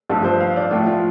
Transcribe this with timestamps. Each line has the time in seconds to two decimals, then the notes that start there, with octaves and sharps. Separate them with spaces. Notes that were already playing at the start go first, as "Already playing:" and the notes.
0.10 G2 F3 A3 A4
0.25 C5
0.40 F5
0.56 D5
0.71 A2 F3 A3 F4
0.87 F4